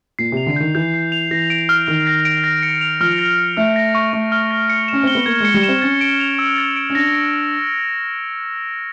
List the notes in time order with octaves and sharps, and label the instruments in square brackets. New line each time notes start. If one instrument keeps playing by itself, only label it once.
[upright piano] A#2 [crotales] C7
[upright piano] C3 [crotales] F7
[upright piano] D3
[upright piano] D#3 [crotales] G6
[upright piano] E3 [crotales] G6
[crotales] C7
F7
[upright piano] E3 [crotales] A#6
[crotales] D7
F6
[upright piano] D#3 [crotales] F6
[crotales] A#6
D7
A#6
C#7
F7
[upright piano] F3 [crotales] F6
[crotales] A#6
C#7
[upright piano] A3 [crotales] F6
[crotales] A#6
C#6
[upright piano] A3 [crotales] C#6
[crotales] F6
A#6
C#7
[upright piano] C#4 [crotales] E7
[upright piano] C4 [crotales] G7
[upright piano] B3
[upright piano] A#3 [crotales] G#6
[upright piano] G#3 [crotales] C#7
[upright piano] G3
[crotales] E7
[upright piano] C4
[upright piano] C#4 [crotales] A6
[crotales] D7
F7
E6
A6
D7
[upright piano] C#4
[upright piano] D4 [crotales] A#6
[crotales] C#7